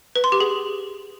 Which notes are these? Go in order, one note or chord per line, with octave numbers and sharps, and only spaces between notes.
B4
C6
G4
G#4